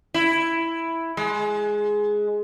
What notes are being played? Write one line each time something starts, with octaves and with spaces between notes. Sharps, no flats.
E4
G#3